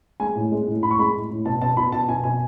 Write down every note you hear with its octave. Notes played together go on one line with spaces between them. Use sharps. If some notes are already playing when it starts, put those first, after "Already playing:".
G#3 G#5
A2
G#3
A2
A2 B5
C#6
G#3 B5
A2
A2
B2 A5
B2 A5
B2 B5
B2 A5
B2 G#5
B2 G#5